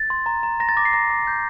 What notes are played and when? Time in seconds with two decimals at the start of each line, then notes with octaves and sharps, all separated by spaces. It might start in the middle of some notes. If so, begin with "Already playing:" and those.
Already playing: A6
0.10 C6
0.26 A#5
0.43 A#5
0.60 A#5 A#6
0.69 A6
0.77 D6 A#6
0.85 C7
0.93 A#5 A#6
1.10 D6
1.27 G6